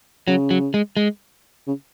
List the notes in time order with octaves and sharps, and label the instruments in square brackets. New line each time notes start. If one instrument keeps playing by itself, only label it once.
[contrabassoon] C#3 [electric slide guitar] F#3
[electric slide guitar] F#3
G#3
G#3
[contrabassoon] C#3